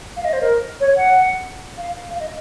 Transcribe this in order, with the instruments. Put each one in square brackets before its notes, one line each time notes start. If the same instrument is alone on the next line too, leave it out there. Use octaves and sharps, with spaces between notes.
[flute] F5
D#5
C5
A#4
C#5
F#5
F5
F5
D#5